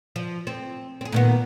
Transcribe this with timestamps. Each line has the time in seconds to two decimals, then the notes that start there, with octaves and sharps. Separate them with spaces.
0.16 F3
0.47 C4
1.01 C4 G#4
1.12 A#2 D#3 B3